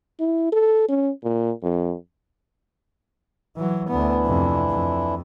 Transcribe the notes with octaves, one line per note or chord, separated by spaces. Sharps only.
E4
A4
C#4
A#2
F2
E3 F#3
D2 E3 B3 D4 E4
F2 C3
F2